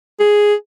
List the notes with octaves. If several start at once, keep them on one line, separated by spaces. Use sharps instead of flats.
G#4